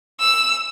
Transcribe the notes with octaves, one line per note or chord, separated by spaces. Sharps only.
E6